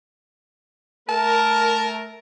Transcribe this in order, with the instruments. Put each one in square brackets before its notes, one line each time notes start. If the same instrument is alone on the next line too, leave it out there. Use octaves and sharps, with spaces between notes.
[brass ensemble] A3 A#4 [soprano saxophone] A5